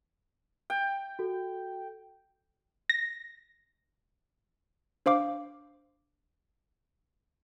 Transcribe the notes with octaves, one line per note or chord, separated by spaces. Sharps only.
G5
F#4 A4
A#6
D4 C5 F5 D6